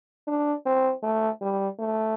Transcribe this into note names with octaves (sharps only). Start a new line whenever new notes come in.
D4
C4
A3
G3
A3